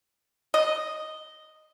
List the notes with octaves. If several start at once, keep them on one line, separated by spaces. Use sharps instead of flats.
D#5